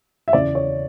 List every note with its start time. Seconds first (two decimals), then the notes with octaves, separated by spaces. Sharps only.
0.28 E5
0.33 E2 C#3 E3 D5
0.55 C#5